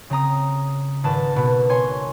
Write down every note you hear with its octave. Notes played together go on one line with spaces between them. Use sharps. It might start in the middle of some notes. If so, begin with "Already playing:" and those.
C#3 C4 A#5 D#6
G#1 B4 A5
B2 B3
C#5 G#5 C6